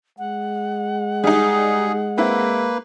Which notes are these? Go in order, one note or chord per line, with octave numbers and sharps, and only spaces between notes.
G#3 F#5
G3 D#4 G#4
A#3 C4 E4 B4